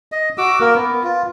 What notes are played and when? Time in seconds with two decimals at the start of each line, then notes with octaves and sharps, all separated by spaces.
0.12 D#5
0.38 F#4 D6 E6
0.61 A#3 A#4
0.75 B3
1.03 F4